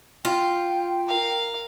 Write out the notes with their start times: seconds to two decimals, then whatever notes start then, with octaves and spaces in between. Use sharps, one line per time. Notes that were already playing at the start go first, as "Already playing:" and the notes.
0.25 F4 G5
1.07 A#4 F5